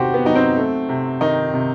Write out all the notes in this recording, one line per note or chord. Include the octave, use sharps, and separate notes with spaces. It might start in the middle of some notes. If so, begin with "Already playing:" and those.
Already playing: E2 C3 D#3 F#4 G4 C5
B3
F#3 D#4
C4
A3
C3
D#3 D#4
C3